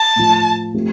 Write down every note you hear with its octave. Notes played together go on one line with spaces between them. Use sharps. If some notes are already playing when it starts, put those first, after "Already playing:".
Already playing: A5
A2 F3 A3
F3 A3 C4 G4